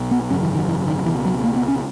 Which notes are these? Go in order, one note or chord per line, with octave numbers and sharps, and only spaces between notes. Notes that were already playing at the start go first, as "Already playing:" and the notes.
Already playing: B1 B2
B3
G#1 F#2 C#3 C#4
E3
D#3
E3
D#3
C#2 B2 E3
F#3
A#3
B3
C#4